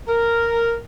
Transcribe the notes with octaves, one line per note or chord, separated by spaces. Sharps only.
A#4